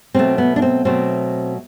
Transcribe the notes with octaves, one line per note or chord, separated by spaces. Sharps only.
B2 F#3 A3 C4
B3
D4
C4
B2 F#3 A3 C4